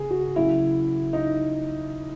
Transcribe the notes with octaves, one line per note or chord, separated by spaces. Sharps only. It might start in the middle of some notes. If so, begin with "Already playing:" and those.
Already playing: C#3 G#4
F#4
C#3 F#3 E4
D#4